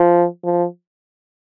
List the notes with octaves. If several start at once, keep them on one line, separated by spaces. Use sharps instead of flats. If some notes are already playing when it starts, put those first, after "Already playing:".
Already playing: F3
F3